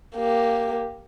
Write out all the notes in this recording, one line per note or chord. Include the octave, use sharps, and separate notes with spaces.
A#3 G4